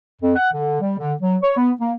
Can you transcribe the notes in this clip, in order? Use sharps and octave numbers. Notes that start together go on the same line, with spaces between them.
F2
F#5
D3
G3
D3
F#3
C#5
B3
A#3